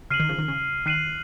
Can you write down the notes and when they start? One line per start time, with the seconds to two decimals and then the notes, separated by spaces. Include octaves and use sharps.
0.10 C#3 F6 C7 D#7 F#7
0.20 D#3
0.29 C#3 F3
0.39 D#3
0.48 C#3
0.86 D#3 F#6 C7 D#7 F#7